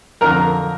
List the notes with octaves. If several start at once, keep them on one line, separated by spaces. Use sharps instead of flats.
F2 D3 A#4 A#5